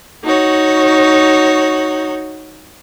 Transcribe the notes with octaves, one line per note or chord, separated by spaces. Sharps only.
D#4 F#4 C#5